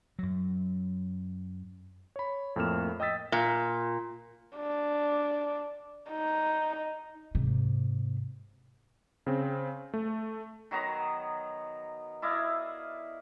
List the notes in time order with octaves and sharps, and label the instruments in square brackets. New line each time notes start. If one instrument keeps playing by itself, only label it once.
[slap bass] F#2 F#3
[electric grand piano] C#5 B5
F2 A2 A#3 F6 E7
D#5 G5 D#6 E6 A6 B6
[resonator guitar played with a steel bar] A#2
[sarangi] D4
D#4
[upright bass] G#2 C3
[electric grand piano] C#3 C4
A3
[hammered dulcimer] D#3 F#3 B3 A#5
E4 D5 D#5 F5